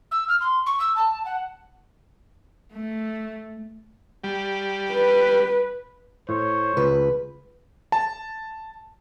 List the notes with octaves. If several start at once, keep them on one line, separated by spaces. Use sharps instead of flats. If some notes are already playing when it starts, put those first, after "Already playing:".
E6
F6
C6
C#6
E6
A5
F#5
A3
G3
B4
A2 C5 C#5
C#2 B4
A5